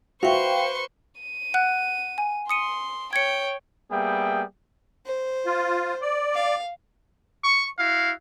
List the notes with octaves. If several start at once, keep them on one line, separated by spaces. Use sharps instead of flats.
F#4 B4 C5 E5 F5 G5 C6 C#6
D#7
F#5 F#6
G#5
C6 D#6 C#7 D#7
C#5 G5 G#6 C#7
G3 A#3 B3 G#4 E5 G5
C5
F4
D5
F5
C#6
E4 F#4 F5